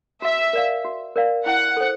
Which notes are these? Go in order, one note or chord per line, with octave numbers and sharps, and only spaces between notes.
F#4 E5
A#4 D5 F5
F#4
A#4 D5 F5
E4 F#5
A4 C5